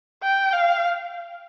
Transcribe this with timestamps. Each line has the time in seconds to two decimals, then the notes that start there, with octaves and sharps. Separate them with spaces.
0.23 G5
0.53 F5